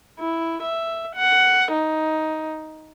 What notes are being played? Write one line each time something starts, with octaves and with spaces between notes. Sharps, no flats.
E4
E5
F#5
D#4